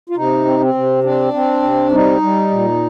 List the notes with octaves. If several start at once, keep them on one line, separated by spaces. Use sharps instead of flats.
F4
C3 D#4
C4
C4
C3
C4 D4
C4
C3
G3 D#4
G3
A#2